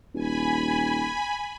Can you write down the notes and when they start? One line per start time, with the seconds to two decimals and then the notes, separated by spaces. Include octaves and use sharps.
0.15 D#1 G#5 B5